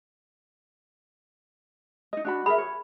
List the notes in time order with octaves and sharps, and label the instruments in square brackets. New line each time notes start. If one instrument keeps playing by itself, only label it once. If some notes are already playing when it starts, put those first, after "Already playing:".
[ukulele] D#4 D#5
D4 F#4 B5
[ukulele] G#4 A#4 E5 [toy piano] B5
[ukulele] C#5